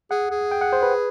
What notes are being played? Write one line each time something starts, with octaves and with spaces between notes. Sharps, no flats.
G#4 F#5
G#4
G5
F#5
C5
B4